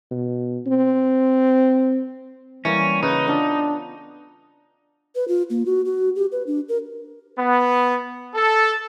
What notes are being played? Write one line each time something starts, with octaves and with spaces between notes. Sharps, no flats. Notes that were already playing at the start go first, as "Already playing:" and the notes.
B2
C4
E3 G3 A#3 C#4
C#3 D#4 B4
B3 D4 F4 A4
B4
F4
A#3
F#4
F#4
G4
B4
D4
A#4
B3
A4